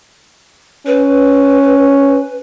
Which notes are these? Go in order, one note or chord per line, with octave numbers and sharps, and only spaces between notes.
C#4 B4